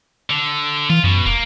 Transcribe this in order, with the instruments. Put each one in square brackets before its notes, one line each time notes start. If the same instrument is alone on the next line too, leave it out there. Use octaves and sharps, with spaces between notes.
[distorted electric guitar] D3
[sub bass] E3 [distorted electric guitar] F4
[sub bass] F#2 [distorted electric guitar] B2
[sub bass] E1 [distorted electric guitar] A#3